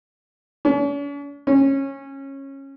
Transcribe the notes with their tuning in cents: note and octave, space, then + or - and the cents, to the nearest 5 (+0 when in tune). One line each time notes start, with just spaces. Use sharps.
C#4 +45
C#4 -20